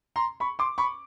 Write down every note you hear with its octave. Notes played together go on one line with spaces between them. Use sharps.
A#5 C6
B5 C#6
C6 D6
B5 C#6